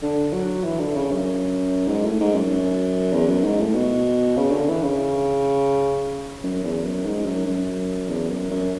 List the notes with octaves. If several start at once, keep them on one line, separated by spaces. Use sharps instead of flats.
D3
F#3
E3
D3
C#3
F#2
G#2
A2
G#2
F#2
F#2
E2
F#2
G#2
A2
B2
C#3
D3
E3
C#3
F#2
E2
F#2
G#2
F#2
F#2
E2
F#2
F#2